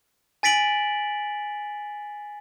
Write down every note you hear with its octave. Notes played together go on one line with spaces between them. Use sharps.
G#5 A6 B6 D7 F#7